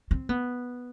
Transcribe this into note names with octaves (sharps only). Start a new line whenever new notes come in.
C4
B3